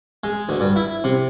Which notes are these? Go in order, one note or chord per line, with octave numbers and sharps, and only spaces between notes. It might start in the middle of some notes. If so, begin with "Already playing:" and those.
G#3
D2
G2
E4
C3